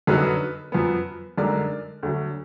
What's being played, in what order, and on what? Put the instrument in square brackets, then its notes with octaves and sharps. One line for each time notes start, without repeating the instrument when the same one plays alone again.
[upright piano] F#2 D3 F#3 B3 D#4 B4
F#2 F3 B3
F#2 D3 G#3 D#4 A#4 D5
D2 D3 F#3